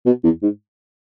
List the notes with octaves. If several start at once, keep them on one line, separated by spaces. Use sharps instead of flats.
B2
E2
G#2